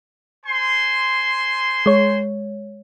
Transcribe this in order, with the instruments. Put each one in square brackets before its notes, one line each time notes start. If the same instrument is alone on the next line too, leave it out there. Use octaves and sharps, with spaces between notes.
[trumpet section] C5 G#5 C6
[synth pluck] G#3 C#5